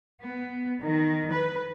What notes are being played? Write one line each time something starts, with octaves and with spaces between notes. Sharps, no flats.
B3
D#3
B4